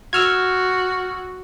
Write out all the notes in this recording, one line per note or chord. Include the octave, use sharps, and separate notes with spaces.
F#4 E6 F6 G#6